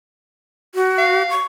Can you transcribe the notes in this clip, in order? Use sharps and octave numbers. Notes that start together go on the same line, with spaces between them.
F#4
F5
C#6